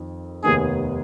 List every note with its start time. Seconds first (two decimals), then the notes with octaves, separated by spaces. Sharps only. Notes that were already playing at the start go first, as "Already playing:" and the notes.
Already playing: F2 D#3
0.43 F1 D#2 D#3 B3 D#4 G#4